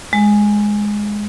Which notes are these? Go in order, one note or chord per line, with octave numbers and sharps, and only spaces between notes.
G#3